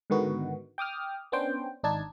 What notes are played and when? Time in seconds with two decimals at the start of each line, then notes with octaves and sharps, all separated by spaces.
0.10 G#2 D3 D#3 B3 F#4
0.78 G5 D6 D#6 F6
1.32 B3 C#4 D4 C5 G5
1.83 G#1 D4 D#4 A5 G#6